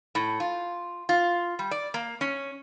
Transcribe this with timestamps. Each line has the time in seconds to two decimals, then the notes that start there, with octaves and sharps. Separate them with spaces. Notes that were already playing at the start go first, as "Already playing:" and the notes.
0.15 A2
0.40 F4
1.09 F4
1.59 G3
1.71 D5
1.94 A#3
2.21 C#4